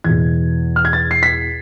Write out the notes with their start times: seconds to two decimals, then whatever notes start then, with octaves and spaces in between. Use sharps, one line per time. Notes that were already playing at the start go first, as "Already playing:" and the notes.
0.04 E2 B2 G#6
0.76 F6
0.85 G#6
0.93 A6
1.11 C7
1.23 B6